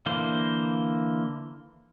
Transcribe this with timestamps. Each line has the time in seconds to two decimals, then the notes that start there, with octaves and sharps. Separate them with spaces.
0.06 D3 E3 A#3 C5